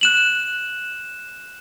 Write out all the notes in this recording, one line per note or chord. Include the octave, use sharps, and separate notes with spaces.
F#6 E7 F#7